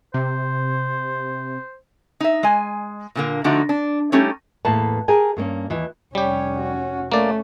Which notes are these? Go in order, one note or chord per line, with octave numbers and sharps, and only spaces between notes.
C3 C5
D#4 E5
G#3 G#5
A#2 D3 A#3
D3 F3 A3 D4 D#4 F#4
D4
G3 A3 C#4 D#4 G4 A4
E2 A2 A#3 B4 A5
G4 G#4 A#4 G#5
G2 A#3 C#4
D#2 E3
F1 G3 C#4 G4 C#5
F#4
A3 A#3 C#4 D5